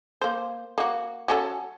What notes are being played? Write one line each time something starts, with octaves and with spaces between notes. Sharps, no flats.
A#3 C5
A#3 F#4
F#3 C#4 A4